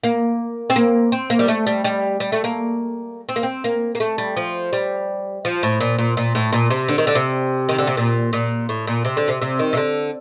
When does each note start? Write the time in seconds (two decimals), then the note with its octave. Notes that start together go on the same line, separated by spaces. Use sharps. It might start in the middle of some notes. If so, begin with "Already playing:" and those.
0.04 A#3
0.70 C4
0.76 A#3
1.12 C4
1.30 A#3
1.39 G3
1.48 A3
1.67 G3
1.84 G3
2.20 G3
2.32 A3
2.44 A#3
3.29 C4
3.36 A#3
3.43 C4
3.64 A#3
3.95 A#3
4.00 A3
4.18 G3
4.36 F3
4.73 G3
5.45 F3
5.63 A2
5.81 A#2
5.99 A#2
6.17 A#2
6.35 A2
6.52 A#2
6.70 C3
6.88 D3
6.98 D#3
7.07 D3
7.15 C3
7.69 D#3
7.78 D3
7.87 C3
7.97 A#2
8.33 A#2
8.69 A2
8.87 A#2
9.05 C3
9.17 D3
9.28 C3
9.41 C3
9.59 D#3
9.73 C3
9.77 D3